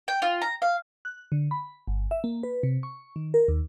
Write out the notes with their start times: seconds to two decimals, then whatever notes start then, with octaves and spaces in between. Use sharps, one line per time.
0.08 G5
0.22 F4
0.42 A#5
0.62 F5
1.05 F#6
1.32 D3
1.51 B5
1.87 G1
2.11 E5
2.24 A#3
2.43 B4
2.63 C3
2.83 C#6
3.16 D#3
3.34 A#4
3.48 D#2